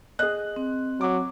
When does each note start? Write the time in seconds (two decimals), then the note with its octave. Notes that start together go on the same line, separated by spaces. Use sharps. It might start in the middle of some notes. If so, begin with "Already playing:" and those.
0.19 G#4 D#5 F#6
0.56 C4
1.01 F#3 D6